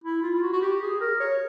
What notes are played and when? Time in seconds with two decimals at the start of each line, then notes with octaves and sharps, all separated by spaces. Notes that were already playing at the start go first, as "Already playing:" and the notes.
0.04 E4
0.23 F4
0.34 F4
0.42 F#4
0.53 F#4
0.62 G4
0.82 G#4
1.01 A#4
1.20 C#5